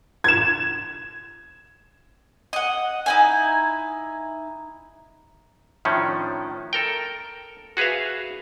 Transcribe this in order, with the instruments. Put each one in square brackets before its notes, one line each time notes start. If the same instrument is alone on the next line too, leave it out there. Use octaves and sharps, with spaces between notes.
[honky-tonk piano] G#6 E7
[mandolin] D#5 F#5
D#4 E4 G#5
[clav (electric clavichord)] A2 D#3 F3 C#4 D4
A4 A#4 G5
F#4 G#4 B4 E5 F5